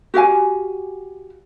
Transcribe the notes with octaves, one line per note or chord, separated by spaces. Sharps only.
F#4 G4 F5 G#5